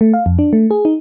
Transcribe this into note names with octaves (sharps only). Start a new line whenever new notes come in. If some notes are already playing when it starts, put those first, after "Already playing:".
A3
F5
F2
D4
A3
G#4
D#4